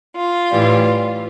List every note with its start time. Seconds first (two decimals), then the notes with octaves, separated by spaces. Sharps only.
0.17 F4
0.50 A2 E3 G3